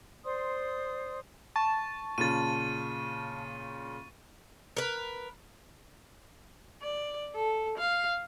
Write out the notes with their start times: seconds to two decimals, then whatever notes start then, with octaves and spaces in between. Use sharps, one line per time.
0.24 C5 D5 C6 D#6
1.56 A5 C#6
2.18 A#2 C#3 A6 D#7
4.77 A#4 B4
6.82 D5
7.35 A4
7.78 F5